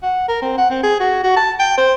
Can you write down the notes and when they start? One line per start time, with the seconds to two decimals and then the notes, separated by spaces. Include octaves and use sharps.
0.03 F#5
0.28 A#4
0.42 C4
0.58 F#5
0.70 C4
0.83 G#4
1.00 F#4
1.23 F#4
1.36 A5
1.59 G5
1.77 C5